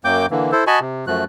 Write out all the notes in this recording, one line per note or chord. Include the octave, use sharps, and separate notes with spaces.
F#2 F#3 A#3 G5 D6 G6
D3 E3 A#3
E4 A4 C5
F#4 D#5 G#5 A5 B5 C#6
C3
F#2 F3 A3 F#4 F#6